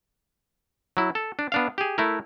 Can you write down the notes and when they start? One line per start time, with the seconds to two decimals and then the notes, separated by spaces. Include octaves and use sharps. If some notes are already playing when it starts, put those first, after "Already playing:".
0.97 F#3 E4
1.15 A4
1.39 D4
1.52 B3 D4 F5
1.78 G4 G#4
1.98 A3 E4 A#4